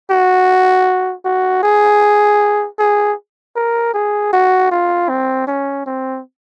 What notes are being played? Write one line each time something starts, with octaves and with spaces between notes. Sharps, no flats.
F#4
F#4
G#4
G#4
A#4
G#4
F#4
F4
C4
C#4
C4